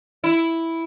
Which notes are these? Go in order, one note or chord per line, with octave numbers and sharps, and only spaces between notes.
E4